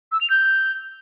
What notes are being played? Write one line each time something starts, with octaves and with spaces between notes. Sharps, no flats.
E6
F7
G6